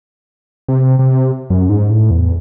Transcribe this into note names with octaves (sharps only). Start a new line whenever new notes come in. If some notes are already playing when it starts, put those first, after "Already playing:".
C3
C3
F#2
G#2
A2
E2